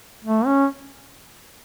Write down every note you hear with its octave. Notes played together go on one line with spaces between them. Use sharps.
A3
C#4